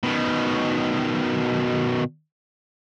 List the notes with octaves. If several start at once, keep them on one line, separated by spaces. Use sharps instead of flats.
B2 D#3